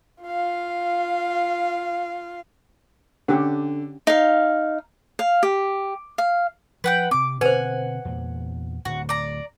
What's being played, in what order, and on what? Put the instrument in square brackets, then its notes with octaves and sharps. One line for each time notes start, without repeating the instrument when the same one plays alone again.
[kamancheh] F4 F5
[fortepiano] D3 [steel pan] C#4 G4 F#5
[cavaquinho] D#4 F5
F5
G4
F5
[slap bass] F3 [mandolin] B4 F#5 G5
[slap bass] C3 C4 [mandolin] D6
[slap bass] B2 D3 C4 [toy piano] B4 C5 [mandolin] F#5 G#5
[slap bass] E2 A#2
[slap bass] D1 D2 [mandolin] F#4
[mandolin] D5 A#5